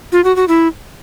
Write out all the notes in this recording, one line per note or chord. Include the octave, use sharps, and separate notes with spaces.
F4
F#4
F#4
E4